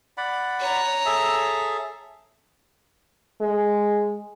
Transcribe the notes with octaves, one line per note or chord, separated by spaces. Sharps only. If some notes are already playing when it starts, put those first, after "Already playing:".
D5 F#5 B5
C#5 A#5
G#4 A4 E5
G#3